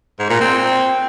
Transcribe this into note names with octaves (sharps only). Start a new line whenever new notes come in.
G#2
A#2
C4